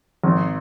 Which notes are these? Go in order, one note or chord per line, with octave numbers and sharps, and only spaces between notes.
G#1